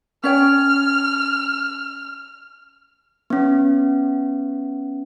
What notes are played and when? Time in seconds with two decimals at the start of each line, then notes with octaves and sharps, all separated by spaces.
0.24 C#4 C#5 G5 F6
3.30 B3 C#4